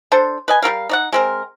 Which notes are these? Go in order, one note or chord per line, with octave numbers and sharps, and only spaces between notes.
D4 A4 C5
B4 D#5 G#5
G3 F4 A#4 F5
D#4 D5 F#5
G#3 C4 A#4